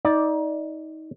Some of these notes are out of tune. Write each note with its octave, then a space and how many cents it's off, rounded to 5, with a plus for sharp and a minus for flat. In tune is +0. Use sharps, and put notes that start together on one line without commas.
D#4 +25 D5 +0